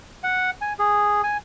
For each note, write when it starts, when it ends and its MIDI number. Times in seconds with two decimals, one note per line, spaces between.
0.24 0.50 78
0.61 0.73 80
0.79 1.22 68
1.23 1.37 80